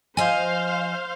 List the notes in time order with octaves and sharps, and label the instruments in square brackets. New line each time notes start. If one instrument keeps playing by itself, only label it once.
[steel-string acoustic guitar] F3 D#5 G#5 [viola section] C5 F5